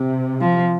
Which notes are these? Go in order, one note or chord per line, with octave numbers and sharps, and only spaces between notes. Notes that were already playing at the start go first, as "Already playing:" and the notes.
Already playing: C3
F3